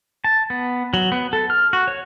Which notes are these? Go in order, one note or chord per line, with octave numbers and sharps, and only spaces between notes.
A5
B3
F#3
B3
A4
F6
F#4
C#5